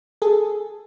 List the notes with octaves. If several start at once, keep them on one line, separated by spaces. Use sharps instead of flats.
G#4 A4